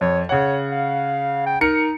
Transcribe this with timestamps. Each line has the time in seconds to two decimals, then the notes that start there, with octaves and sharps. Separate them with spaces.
0.01 F2 C#5
0.29 C#3 C#5 F#5
0.71 F5
1.46 G5
1.61 D#4 A#4 C#7